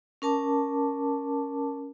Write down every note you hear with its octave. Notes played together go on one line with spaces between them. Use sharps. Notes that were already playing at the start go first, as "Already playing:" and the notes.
C#4 A#4 A5 D6